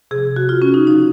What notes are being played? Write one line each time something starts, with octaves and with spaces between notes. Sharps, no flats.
C3 F3 G#4
F#4
F4
C#4
D#4
C#3 F3 D#4